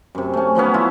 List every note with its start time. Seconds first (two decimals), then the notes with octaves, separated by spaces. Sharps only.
0.15 F#2 C3
0.34 A3 C#4
0.55 F3 F#3 B3 C#4
0.74 E4 F4 E5